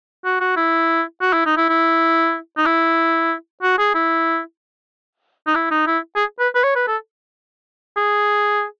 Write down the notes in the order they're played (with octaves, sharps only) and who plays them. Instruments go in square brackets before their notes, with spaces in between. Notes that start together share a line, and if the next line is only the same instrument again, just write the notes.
[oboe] F#4
F#4
E4
F#4
E4
D#4
E4
E4
D#4
E4
F#4
G#4
E4
D#4
E4
D#4
E4
G#4
B4
B4
C#5
B4
A4
G#4